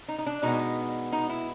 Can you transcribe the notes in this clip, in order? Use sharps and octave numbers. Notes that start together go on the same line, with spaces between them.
D#4
D#4
D4
B2 G#3 B3 D#4
D#4
E4